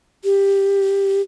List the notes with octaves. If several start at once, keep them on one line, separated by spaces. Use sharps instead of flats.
G4